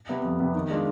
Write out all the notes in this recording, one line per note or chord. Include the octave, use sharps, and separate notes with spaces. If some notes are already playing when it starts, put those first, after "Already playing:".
C3 G3 B3
F2
C3 G3 B3
D#3
G#3 D4 F4